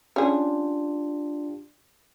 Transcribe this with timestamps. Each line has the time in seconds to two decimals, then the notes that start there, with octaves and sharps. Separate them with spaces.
0.16 C#4 D4 F4 G4 G#4